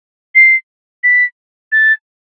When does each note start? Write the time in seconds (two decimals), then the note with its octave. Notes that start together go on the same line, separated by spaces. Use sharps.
0.35 C7
1.04 B6
1.72 A6